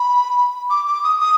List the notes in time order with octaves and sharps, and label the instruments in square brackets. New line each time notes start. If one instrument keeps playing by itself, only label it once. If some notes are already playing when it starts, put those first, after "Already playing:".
Already playing: [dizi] B5
D6
D6
D#6
D#6